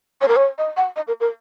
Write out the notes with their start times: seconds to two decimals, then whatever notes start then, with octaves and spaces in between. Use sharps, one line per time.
0.21 C#5
0.28 A#4
0.36 C#5
0.58 D#5
0.77 F#5
0.96 D#5
1.07 A#4
1.20 A#4